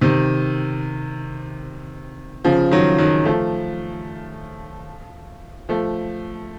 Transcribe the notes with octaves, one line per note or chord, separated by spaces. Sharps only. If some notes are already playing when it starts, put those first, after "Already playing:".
C3 D#3
C#3 F3
D#3 F#3
D#3 F#3
F3 A3
F3 A3